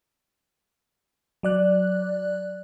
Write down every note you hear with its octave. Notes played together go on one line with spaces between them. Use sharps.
F#3 D5 F#6